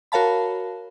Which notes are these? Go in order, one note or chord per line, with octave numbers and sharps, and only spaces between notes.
F#4 A#4 C#5 F5 A5 B5